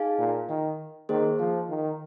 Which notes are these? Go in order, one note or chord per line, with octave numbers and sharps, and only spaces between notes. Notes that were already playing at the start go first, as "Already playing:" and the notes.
Already playing: D#4 G#4 F5 G#5
A#2
D#3
D#3 A#3 G#4 C5
F3
D#3